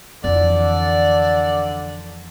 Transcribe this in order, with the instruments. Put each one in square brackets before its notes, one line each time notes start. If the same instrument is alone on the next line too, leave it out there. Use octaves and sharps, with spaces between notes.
[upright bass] F2 E3 [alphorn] D3 [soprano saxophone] D5